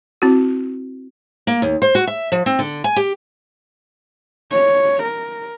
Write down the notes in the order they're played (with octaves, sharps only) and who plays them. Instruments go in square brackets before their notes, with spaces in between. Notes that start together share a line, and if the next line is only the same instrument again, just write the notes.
[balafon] C4 E4 F#4
[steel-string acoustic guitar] A#3
D#2
C5
F#4
E5
F3
C4
D3
G#5
G4
[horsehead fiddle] C#5
A#4